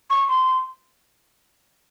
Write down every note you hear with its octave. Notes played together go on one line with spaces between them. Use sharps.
C#6
C6